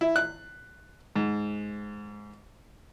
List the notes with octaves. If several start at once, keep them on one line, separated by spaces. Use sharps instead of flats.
E4
F#6
G#2